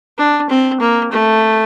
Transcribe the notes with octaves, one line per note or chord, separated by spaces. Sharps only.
D4
C4
A#3
A3